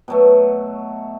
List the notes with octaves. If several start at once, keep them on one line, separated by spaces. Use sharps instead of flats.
B2 F#3 A3